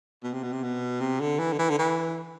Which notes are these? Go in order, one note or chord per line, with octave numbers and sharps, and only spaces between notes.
B2
C3
B2
C3
B2
C3
D3
E3
D3
E3
D3
E3